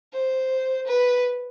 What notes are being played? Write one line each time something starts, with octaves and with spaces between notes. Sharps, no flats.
C5
B4